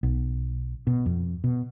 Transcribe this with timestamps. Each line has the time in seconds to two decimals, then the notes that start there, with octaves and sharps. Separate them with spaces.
0.03 B1
0.87 B2
1.06 F2
1.44 B2